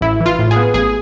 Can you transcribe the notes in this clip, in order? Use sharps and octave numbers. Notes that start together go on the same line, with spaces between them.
A1 E4
E3
F4
A2
G#4
B3
A1 G#4